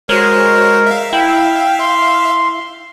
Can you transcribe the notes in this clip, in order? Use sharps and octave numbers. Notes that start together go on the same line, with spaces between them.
G#3 F#4 A#4 C5 C#5
E5 F5
E4 G5
C6